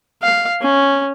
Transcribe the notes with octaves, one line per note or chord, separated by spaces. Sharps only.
F5
C#4